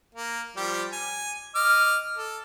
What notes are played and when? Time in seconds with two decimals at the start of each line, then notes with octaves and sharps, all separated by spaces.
0.15 A#3
0.57 F3 G3 G4
0.93 G#5
1.55 D#5 D6 F6
2.17 A4